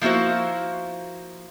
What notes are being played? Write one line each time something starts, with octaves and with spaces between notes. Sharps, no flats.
F3 A#3 E4 F#4 C5